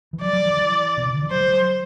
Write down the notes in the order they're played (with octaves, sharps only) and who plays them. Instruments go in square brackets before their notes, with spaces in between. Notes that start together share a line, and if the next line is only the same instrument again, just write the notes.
[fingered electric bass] E3
[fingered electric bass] F#3 [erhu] D5
[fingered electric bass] F#3
E3
E3
B2
C3
D3
E3
[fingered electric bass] F#3 [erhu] C5
[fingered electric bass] G3
F#3